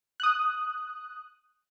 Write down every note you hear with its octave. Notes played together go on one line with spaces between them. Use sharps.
D#6 F#6